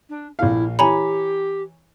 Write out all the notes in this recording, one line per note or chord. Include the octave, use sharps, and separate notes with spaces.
D4
A#1 E4 F5
E3 G4 C#5 G#5 A#5 B5